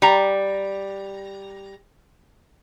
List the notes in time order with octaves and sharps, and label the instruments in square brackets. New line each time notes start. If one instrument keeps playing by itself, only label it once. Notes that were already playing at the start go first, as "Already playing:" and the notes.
[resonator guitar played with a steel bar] G3 A#5